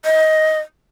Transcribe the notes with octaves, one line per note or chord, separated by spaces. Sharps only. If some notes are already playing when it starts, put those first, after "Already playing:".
D#5